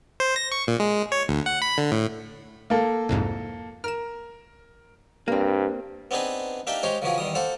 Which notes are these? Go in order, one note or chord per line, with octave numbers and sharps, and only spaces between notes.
C5
A#6
C#6
A#2
G#3
C#5
D2
F#5
B5
D3
A2
A#3 A4
C2 F2 G#2
A#4 F6 E7
G2 A#3 C4
B3 C4 D4 D#4 G#4 B4
A#3 D4 D#4 G4 E5 G5
G#3 D#4 G4 C5 C#5
C#3 E3 F3 F#4 G#4
E2 D#3 G3 D#6
A#3 A4 C5 F#5